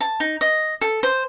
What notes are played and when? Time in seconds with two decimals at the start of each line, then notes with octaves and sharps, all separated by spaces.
0.01 A5
0.20 D#4
0.41 D#5
0.81 A4
1.03 C5